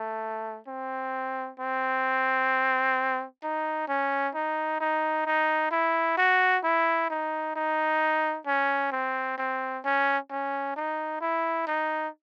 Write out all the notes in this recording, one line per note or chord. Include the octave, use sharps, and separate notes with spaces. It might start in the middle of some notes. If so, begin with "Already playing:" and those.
Already playing: A3
C4
C4
D#4
C#4
D#4
D#4
D#4
E4
F#4
E4
D#4
D#4
C#4
C4
C4
C#4
C#4
D#4
E4
D#4